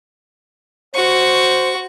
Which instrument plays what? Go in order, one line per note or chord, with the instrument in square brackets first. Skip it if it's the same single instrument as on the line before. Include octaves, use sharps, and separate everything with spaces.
[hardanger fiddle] F#4 C#6 [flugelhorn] C5